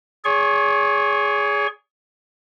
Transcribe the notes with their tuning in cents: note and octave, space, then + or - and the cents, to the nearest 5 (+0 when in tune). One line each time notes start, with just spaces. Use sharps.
G#4 +0 C#5 +40 C#6 -35